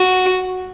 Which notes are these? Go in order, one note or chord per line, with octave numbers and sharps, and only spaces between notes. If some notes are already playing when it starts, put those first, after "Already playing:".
Already playing: F#4